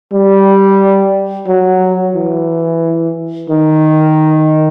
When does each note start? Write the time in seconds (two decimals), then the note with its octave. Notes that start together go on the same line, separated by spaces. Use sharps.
0.13 G3
1.47 F#3
2.15 E3
3.50 D#3